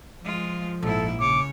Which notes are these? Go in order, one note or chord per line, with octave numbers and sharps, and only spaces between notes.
F3 G#3 F4
A#1 G#2 E4 A4
C#3 C#5 D6